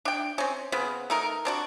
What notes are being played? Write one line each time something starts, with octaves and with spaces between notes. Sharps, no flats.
D4 G5
C4 C#4
C#3 B3 C4
A3 D#4 A#4
C4 D4 F#4